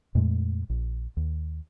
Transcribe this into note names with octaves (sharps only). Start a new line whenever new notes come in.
F2 A#2 G#3 A3
A#1
D#2